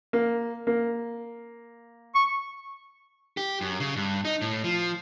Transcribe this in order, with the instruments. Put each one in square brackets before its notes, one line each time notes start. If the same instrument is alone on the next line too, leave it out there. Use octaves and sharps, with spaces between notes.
[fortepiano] A#3
A#3
[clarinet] C#6
[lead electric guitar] G4
F#2
C#3
G2
D#4
A2
F3